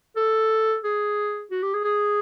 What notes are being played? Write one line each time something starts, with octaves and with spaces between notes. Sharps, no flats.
A4
G#4
F#4
G4
G#4
G#4